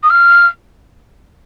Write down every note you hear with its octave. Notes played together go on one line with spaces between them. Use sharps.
D#6
F6